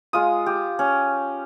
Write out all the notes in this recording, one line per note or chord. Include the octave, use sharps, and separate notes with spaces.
G#3 F4 D#6
G4
C#4